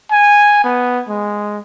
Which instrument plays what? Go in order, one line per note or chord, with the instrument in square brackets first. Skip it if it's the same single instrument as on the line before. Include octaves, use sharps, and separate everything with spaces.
[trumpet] G#5
B3
G#3